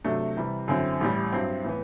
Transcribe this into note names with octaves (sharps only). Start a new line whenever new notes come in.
C3 F#3 A3 D4
C3 E3 G3
F#2 D3 F#3 C4 E4
A1 A2 G3
G2 F#3 C4 E4
A2 E3 B3